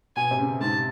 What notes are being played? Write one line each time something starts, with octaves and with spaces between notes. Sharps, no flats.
B2 G#5
C3
C#3
G#2 A5